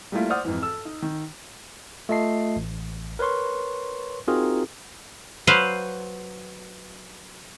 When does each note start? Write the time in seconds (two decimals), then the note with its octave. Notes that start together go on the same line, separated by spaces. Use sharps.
0.12 G3 A3 A#3 E4 F4
0.30 C5 D5 F#5 D#6 F6
0.45 F2 G#2 E3
0.62 A4 E6
0.85 D#4
1.02 D#3
2.09 A3 F4 D#5 A5 C7
2.56 A1
3.19 A#4 B4 C#5 C6 C#6
4.28 C4 D#4 F4 F#4 G#4 A#4
5.47 F#3 B4 C5 F5